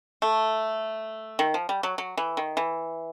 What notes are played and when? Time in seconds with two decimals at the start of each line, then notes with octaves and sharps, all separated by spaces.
0.22 A3
1.39 D#3
1.54 F3
1.69 G3
1.83 F#3
1.98 F#3
2.17 E3
2.37 D#3
2.57 E3